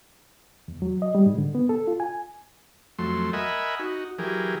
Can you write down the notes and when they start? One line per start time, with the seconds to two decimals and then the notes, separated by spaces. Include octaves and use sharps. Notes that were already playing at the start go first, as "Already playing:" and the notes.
0.68 E2
0.82 F#3
1.02 D#5
1.15 G3
1.26 G#2
1.38 D3
1.55 B3
1.69 A4
1.87 F4
2.00 G#5
2.99 F2 F#3 A3 C6
3.33 A#4 D#5 E5 F#5 G#5 B5
3.80 D#4 F#4
4.19 E3 F#3 G4 G#4 A#4